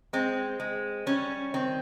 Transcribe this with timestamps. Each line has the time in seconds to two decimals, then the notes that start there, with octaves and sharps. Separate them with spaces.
0.13 G#3 C4
0.60 G#3
1.06 G3 C#4
1.54 D#3 C4